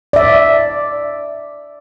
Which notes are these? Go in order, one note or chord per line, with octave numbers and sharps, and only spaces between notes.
D5 E5